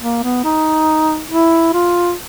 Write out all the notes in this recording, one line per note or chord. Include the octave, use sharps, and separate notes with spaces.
A#3
B3
D#4
E4
F4